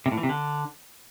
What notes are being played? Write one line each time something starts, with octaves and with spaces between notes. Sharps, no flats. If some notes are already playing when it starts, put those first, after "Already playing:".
C3
A2
E3
C3
D3